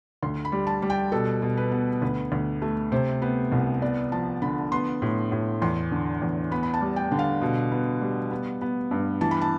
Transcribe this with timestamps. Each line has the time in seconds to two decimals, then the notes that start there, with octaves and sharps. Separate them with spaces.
0.22 D2 C6
0.45 B5
0.52 G3
0.67 A5
0.82 G3
0.90 G5
1.12 B2 A4
1.42 B2
1.57 B4
1.72 B3
2.02 D2 B4
2.32 D2
2.62 A3
2.92 C3 C5
3.22 B3
3.52 C2
3.82 B3 D5
4.12 F3 A5
4.42 D3 B5
4.72 B3 C6
5.02 A2
5.32 A2
5.62 E2 C6
5.92 D3
6.22 E2
6.51 B3 B5
6.63 B5
6.74 A5
6.81 G3
6.96 G5
7.12 D3
7.19 F5
7.41 B2
7.72 B3
8.01 G3
8.31 B3
8.61 B3
8.91 G2
9.21 E3 A5
9.31 B5
9.42 A5